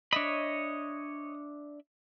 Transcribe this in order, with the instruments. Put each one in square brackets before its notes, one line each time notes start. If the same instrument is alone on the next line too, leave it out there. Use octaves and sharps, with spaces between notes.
[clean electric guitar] D4 E5 B5 [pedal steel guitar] C#5 D#5